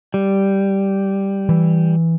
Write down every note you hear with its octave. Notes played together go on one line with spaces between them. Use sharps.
G3
E3